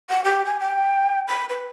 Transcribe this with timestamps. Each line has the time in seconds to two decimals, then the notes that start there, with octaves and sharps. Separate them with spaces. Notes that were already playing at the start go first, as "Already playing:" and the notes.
0.10 F#5
0.24 G4
0.45 G#5
0.60 G5
1.27 B5
1.49 B4